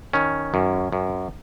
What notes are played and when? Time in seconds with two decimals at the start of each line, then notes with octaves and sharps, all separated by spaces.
0.13 D#3 C#4
0.54 F#2
0.92 F#2